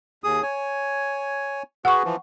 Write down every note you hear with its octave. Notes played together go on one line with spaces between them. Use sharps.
D#2 G#4 D#6
C#5 G#5
F#4 G#4 B4 F#5 C#6
E3 F3